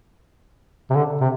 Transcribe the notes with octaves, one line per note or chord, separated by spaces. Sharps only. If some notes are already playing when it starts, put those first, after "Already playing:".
C3
D3
C3